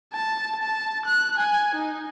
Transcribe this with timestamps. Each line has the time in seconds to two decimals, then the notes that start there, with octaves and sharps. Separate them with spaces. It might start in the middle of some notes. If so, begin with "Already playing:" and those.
0.13 A5
0.62 A5
1.06 F#6
1.37 G#5
1.75 D#4